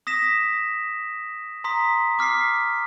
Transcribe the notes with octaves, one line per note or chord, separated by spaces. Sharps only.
D#6 A#6 B6 E7
A#5 C6 D#6 B6
D6 F6 B6 C7